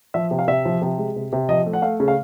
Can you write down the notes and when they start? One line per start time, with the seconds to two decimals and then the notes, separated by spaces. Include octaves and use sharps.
0.14 F3 E5
0.31 C3
0.39 F5
0.48 C3 E5
0.65 F3
0.82 C3
0.98 G#3
1.16 C3
1.32 C3
1.49 F3 D#5
1.66 A3
1.73 F#5
1.82 A3 F5
2.00 C#3
2.08 F5